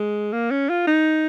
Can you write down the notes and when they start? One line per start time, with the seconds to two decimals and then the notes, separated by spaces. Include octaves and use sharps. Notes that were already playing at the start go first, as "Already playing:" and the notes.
Already playing: G#3
0.32 A#3
0.51 C#4
0.69 F4
0.87 D#4